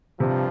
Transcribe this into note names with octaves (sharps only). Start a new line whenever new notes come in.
G2 C3 F3